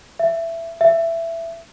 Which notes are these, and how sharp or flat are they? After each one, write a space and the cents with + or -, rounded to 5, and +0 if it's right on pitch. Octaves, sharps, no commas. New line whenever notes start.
E5 +15
E5 +15